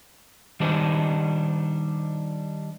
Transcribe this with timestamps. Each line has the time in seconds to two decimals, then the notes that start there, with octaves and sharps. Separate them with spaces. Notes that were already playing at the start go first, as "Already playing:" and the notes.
0.60 D#3 G3 D4 D#4 C5